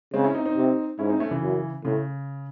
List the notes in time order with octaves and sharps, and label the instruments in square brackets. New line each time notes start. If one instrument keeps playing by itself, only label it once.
[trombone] C#3 [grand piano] G#3 C4
[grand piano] C#4 E4
C4 D#4
C4 D#4
[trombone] C3
[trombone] G#2 [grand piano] C#4 E4
[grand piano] C4 D#4
A3 C#4
C#3 E3
[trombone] F#2
[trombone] A2 [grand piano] C#3